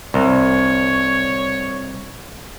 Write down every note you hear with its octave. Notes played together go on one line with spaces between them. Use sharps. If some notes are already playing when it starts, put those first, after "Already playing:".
C2 C#5